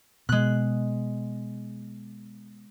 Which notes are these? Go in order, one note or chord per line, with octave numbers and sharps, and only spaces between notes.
B2 G#3 F#6